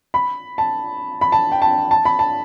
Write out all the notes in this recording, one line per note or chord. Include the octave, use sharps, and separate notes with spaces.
B5
A5
B5
A5
G5
A5
A5
B5
A5